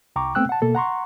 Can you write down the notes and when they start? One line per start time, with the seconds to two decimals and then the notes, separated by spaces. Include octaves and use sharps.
0.16 C2 G5 A#5 C#6 D6
0.35 A3 B3 C4 G5 E6 F#6
0.49 F#5 A5
0.62 B2 A#3 A4
0.75 F#5 A#5 C6 C#6